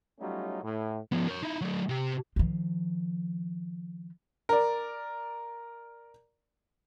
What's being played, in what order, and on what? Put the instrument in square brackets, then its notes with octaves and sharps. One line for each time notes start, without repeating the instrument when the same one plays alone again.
[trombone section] F#3 G3 A3 C#4 D#4 F4
A2
[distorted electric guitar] F3 B3
A#4 C#5
D#4 E4
F#3 A3
C3 G4
[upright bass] D#3 F3
[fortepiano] A#4 D5